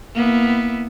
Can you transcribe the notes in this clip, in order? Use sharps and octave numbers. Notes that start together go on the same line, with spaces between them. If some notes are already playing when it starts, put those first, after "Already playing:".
A#3 B3 E4